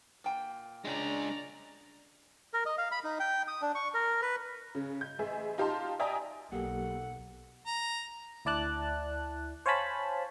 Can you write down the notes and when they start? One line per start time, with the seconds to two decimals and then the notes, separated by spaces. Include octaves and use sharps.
0.24 A#2 G5
0.85 G#3 C#4 D4 D5 A#5
2.54 A#4
2.66 D#5
2.78 F5
2.92 B5
3.04 D#4
3.20 G5
3.48 D#6
3.62 D4
3.75 C#6
3.94 A#4
4.22 B4
4.75 C#3
5.01 G6
5.19 A1 G#4 E5
5.58 D#4 F4 G4 F5 A5 C6
5.99 D5 E5 G5 G#5 A#5 D#6
6.52 B1 F#3 A#3 G4 A4 F#5
7.67 A#5
8.45 D2 E4 D5 A5 F#6
9.66 C5 C#5 F5 G#5 A5 B5